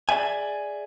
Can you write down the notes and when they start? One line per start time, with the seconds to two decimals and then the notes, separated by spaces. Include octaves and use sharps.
0.09 G#4 D5 E5 G#5